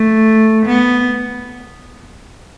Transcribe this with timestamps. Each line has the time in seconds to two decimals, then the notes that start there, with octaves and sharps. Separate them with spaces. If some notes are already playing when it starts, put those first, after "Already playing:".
Already playing: A3
0.66 B3